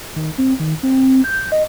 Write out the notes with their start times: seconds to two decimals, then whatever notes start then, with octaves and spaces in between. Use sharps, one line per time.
0.16 D#3
0.38 C4
0.60 D#3
0.83 C4
1.24 G6
1.52 D#5